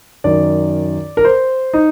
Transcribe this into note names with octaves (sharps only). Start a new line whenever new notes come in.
F#2 D#3 D5
A#4
C5
D#4